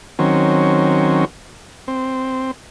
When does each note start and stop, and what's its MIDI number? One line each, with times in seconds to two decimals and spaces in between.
0.19 1.25 51
0.19 1.25 54
0.19 1.25 60
0.19 1.25 61
1.88 2.51 60